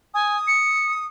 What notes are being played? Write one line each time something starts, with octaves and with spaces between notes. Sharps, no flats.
G#5 D#6
C#7